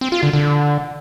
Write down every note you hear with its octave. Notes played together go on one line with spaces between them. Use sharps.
C4
F4
D3
D3